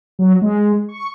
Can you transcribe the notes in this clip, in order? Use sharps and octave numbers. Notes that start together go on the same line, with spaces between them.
F#3
G#3
C#6